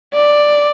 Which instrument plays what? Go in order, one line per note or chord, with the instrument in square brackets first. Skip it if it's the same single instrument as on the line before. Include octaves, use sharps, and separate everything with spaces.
[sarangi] D5